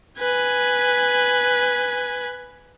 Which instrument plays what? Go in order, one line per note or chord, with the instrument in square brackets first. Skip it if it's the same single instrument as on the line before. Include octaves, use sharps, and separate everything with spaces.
[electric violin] B4 G#5